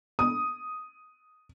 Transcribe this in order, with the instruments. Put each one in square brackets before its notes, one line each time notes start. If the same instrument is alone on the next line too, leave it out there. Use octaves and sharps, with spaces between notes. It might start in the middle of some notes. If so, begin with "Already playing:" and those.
[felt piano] D#6